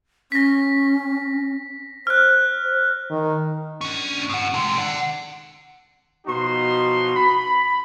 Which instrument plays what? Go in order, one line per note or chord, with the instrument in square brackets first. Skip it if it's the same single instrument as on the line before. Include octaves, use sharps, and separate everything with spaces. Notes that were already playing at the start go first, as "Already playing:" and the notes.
[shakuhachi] C#4 [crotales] A#6 B6
[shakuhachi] C5 [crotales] F6 F#6
[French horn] D#3
[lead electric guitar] C#4 D4
A2 F#5
C3 G#3
D5 F#5
[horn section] B2 F3 D#4 F#4 C6
B5